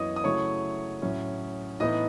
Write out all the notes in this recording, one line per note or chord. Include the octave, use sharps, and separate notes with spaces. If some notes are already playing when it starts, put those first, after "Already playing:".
Already playing: F#2 E3 B3 E4 C#5 D#5 D#6
D#6
C#3 F#3 A3 E4 C#5 C#6
A2 F#3 C#4
A2 E3 B3 D#4 D#5 D#6